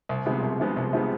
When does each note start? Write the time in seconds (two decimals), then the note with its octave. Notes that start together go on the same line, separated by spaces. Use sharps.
0.09 C2
0.26 C3 F3 G#3 B3
0.43 C2
0.60 C3 F3 G#3 B3
0.77 C2
0.93 C3 F3 G#3 B3